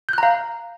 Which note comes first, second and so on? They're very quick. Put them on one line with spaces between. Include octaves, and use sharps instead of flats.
G6 F#6 A#5 F5